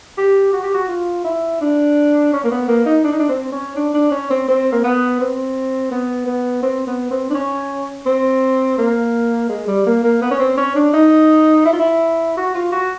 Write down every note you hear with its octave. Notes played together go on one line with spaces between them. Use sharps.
G4
F#4
G4
F#4
F4
E4
D4
C#4
A#3
B3
A#3
D#4
D4
D#4
D4
C4
C#4
D4
D4
C#4
C4
C4
A#3
B3
C4
B3
B3
C4
B3
C4
D4
C#4
C4
A#3
G#3
G3
A#3
A#3
B3
C#4
C4
C#4
D4
D#4
E4
F4
E4
F#4
F4
F#4